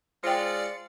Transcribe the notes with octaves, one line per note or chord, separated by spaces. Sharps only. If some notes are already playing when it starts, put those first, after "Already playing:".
G#3 F4 C5 D5 G5 C#7